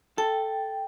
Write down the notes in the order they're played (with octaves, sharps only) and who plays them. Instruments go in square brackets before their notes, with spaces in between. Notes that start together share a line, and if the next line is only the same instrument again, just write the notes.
[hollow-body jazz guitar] A4 [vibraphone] G5